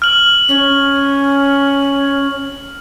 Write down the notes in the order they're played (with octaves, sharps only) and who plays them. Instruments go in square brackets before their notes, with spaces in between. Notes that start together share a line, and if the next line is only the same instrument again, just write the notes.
[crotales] F6 F#7
[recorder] C#4